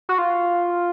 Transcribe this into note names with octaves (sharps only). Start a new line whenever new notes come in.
F#4
F4